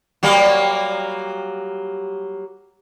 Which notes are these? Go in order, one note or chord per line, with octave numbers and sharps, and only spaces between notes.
F#3 G3 A#3